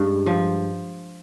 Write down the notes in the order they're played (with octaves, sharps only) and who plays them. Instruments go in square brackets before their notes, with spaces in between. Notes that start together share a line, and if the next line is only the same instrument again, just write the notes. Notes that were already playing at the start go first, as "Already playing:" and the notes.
Already playing: [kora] G2 G#3
F3